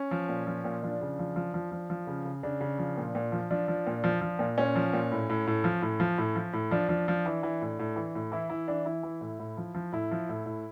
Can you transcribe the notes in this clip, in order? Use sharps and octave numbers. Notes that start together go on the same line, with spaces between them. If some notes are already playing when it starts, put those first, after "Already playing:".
Already playing: C#4
F3
A#2
F3
A#2
F3 D4
C#3
F3
F3
F3
F3
F3
C#3
C#3
C#3 D4
C#3
F3
A#2
A#2
F3
F3 D4
F3
A#2
F3
F3
A#2
A#2 C#4
F3
A#2
A2
A2
A2
F3
A2
F3
A2
F3
A2
F3 D4
F3
F3
E3
E3
A2
A2
E3
A2
E3 E4
E3 E4
E3 D4
E3 E4
E3
A2
A2
F3
F3
A2 E4
F3
A2
A2